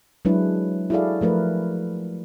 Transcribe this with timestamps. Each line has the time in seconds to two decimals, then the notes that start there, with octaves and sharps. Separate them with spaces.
0.25 F#3 G#3 D4 E4 B4
0.90 E4 F#4 G#4 A4 D5 F5
1.21 F3 A3 A#4 B4